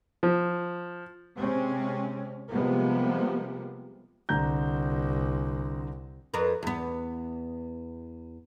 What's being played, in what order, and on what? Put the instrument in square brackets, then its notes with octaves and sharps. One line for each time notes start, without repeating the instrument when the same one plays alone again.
[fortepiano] F3
[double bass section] C3 G#3 C4 C#4
C3 F3 G3 G#3 A#3 B3
[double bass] C2 [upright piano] D3 A#5 G6
[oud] F2 A#4 B4
E2 B3